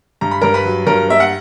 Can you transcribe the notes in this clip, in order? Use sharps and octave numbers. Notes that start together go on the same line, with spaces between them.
G2 A#5
B5
G2 A#4 A#5
B4 B5
F#3
G2 A#4 A#5
A#3 E5
F#5